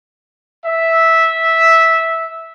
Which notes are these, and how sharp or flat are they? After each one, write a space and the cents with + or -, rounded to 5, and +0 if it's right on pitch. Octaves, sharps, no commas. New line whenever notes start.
E5 -10